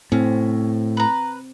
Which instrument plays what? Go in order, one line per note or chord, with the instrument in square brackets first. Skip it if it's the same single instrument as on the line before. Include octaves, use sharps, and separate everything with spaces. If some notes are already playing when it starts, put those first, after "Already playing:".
[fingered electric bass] A2 [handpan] C4 [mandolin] C#4
[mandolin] B4 A#5